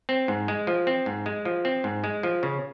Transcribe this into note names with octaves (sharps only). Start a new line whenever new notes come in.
C4
G#2
G#3
F3
C4
G#2
G#3
F3
C4
G#2
G#3
F3
C#3